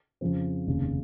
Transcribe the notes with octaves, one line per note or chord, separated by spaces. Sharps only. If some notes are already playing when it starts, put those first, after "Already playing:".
F2 C#3 F3 C4
F1 D#2 C#3